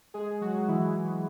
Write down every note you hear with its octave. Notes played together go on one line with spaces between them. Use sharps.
G#3 G#4
F#3 F#4
E3 E4